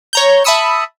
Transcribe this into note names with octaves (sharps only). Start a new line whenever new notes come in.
C#5 A#5 G6
E5 A5 B5 D#6 E6 C#7